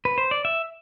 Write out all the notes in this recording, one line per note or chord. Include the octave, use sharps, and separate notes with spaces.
B4
C5
D5
E5